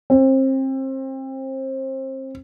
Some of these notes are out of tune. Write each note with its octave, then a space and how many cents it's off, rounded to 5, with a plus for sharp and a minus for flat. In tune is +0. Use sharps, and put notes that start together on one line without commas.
C4 +30